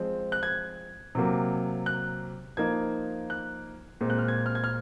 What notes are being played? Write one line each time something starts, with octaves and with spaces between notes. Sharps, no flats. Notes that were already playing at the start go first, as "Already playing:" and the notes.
Already playing: F3 G#3 C4
F#6
G#6
C3 F#3 A#3
F#6
F3 A#3 D#4 G#6
F#6
A#2 G#3 C4
F#6
F6
G#6
F6
G#6
F6